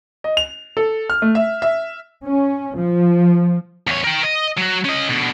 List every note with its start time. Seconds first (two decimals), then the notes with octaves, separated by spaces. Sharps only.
0.24 D#5
0.37 F7
0.77 A4
1.10 F6
1.22 A3
1.35 E5
1.62 E5
2.25 C#4
2.76 F3
3.87 E2 C#5
4.04 A#4 G5
4.24 D#5
4.58 F#3 F#4
4.85 C#4 D#5
5.09 B2 D3